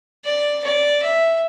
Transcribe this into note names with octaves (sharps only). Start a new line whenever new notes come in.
D5
D5
E5